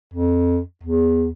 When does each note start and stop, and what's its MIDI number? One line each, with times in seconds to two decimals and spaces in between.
0.14 0.59 41
0.83 1.28 40